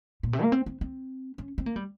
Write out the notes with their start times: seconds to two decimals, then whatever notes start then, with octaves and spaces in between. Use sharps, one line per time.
0.23 A#2
0.33 C3
0.42 A#3
0.52 C4
0.66 C4
0.81 C4
1.38 C#4
1.58 C4
1.66 A#3
1.76 G3